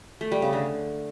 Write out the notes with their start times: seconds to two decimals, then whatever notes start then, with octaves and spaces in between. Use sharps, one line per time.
0.21 A3
0.32 G3
0.42 C#3
0.53 D3